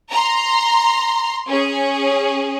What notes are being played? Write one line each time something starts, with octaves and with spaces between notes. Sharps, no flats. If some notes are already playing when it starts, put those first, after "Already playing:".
A#5 C6
C#4 G#4